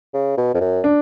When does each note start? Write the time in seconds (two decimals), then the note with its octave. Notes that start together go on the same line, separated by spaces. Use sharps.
0.14 C#3
0.38 B2
0.54 F2
0.61 F#2
0.84 D4